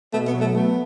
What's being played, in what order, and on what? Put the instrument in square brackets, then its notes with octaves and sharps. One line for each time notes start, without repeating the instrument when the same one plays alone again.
[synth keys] B2 [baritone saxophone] A3
[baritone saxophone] B3
[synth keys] F#3
[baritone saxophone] A3
[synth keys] A3 [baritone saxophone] B3